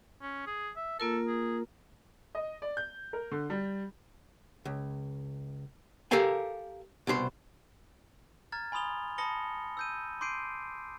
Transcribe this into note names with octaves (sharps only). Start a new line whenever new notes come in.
C#4
G#4
E5
A#3 F4 A4 A#4
G#4
D#5
D5
G6
A#4
D3
G3
C#2
G4 A4 A#4 F5 G5 G#5
C2 B2 G4 C5
A#5 F6 G#6 A6
G#5 B5 C6 D#6 F7 G7
A5 B5 D#6 A#6 C#7 G7
E6 G6 D#7
C6 D6 G6 C7 D7 D#7